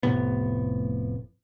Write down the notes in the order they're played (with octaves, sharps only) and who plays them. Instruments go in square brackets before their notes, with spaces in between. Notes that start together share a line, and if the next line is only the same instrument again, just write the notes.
[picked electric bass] F1 A2 C3 B3